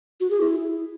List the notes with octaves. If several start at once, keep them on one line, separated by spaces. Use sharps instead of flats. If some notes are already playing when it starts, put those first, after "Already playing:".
F#4
G#4
E4